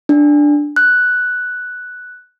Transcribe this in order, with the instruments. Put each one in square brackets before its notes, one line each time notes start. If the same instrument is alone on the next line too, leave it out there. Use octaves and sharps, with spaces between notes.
[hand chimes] D4
F#6